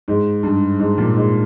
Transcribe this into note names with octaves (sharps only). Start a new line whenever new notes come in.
G#2
G2
G#2
A#2
G#2